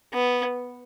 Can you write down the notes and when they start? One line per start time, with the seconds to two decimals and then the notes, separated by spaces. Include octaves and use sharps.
0.13 B3